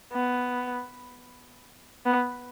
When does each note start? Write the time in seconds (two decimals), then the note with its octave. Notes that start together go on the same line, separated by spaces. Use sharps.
0.13 B3
2.06 B3